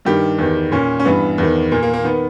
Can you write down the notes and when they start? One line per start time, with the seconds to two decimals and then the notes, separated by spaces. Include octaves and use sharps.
0.05 G2 D#3 G4
0.38 E2 D#3
0.72 A#2 C#4
1.00 C#4
1.05 G2 E3 B3
1.38 E2 D#3
1.71 A#2 A#3
1.83 A#3
1.93 A#3
2.04 D#3 B3